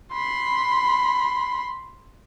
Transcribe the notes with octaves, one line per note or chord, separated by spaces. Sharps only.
B5 C6